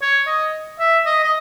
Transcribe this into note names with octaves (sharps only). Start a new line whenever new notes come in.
C#5
D#5
E5
D#5
D#5